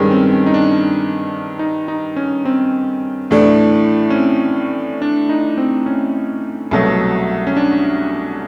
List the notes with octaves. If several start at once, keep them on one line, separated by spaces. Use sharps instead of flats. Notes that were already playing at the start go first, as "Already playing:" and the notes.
Already playing: G2 D#3 G#3 C#4
C4
C#4
D#4
D4
D#4
D#4
C#4
C4
A2 E3 A3 D4
C#4
C4
D4
D#4
C4
C#4
C2 B2 F#3 A3
C#4
D4